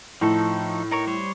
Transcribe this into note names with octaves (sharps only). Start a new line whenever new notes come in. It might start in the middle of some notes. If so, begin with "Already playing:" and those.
A2 F3 D#4 A4
D#4 A#4 C#5
G3 C5 C#5